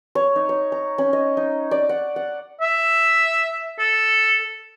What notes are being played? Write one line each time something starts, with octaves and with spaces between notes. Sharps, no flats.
C#5
D#4
C#5
A#5
C#4
D#5
D#4
D5
F#5
F#5
E5
A4